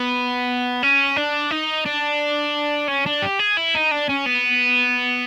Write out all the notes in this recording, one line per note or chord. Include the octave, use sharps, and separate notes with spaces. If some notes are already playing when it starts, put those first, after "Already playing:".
Already playing: B3
C#4
D4
D#4
D4
C#4
D4
G4
G#4
E4
D#4
D4
C#4
B3